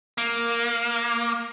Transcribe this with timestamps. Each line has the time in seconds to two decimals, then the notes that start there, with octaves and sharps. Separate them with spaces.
0.18 A#3